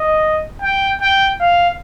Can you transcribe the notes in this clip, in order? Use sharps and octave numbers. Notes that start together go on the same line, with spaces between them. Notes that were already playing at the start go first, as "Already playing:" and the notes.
Already playing: D#5
G5
G5
F5